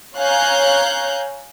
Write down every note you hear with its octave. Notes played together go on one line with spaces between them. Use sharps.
C#5 F5 G#5 A#5 F#6 G6